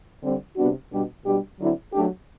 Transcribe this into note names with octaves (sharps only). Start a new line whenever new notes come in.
D3 G3 C4
C3 G3 B3 D4 F#4
B2 G3 D4 G4
B2 G3 D4 G4
D3 F#3 C4 E4
F#3 A3 D4 G4